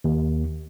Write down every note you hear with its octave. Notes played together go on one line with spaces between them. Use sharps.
D#2